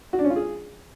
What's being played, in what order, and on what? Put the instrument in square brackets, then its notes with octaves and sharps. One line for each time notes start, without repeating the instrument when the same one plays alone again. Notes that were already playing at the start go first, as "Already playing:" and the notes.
[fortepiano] F#4
D4
C#4
F4
G#4